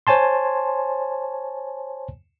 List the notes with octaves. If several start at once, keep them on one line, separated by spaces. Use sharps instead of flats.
C5 C#5 G#5 A5 C6